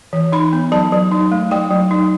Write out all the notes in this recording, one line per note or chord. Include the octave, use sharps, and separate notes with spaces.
E3
D#4 B5
B3
F#3 A5
F#3
D#4
A3
F#3 G5
F#3
D#4